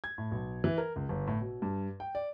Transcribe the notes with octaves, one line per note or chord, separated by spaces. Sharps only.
G#6
A2
B1
E3
A#4
C#2
G1
A2
B2
G2
G5
D5